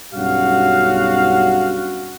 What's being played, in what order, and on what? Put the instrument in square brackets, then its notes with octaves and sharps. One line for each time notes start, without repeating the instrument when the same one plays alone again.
[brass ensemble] B1 G2 C#4 F#4 F5 F#5